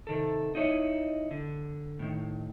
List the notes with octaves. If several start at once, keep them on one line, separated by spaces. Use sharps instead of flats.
C3 D#3 A4
D#4 E4 C#5 D#5
D3
A2 D#3